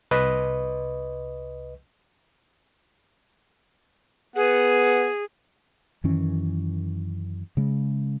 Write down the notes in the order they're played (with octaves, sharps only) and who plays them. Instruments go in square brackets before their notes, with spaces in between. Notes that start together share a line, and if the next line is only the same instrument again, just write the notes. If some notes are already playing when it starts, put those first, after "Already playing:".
[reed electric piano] C2 B4 D#5
[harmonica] B3 F#5 [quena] G#4
[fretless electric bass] F#2 D#3 E3 C#4
C#3 G#3